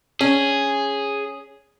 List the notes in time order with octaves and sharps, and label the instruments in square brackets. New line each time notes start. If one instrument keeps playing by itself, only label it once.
[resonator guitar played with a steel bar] C#4 [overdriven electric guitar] G#4